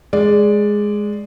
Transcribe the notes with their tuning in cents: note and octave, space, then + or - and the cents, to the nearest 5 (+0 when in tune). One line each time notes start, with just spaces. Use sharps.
G#3 +0 D5 +0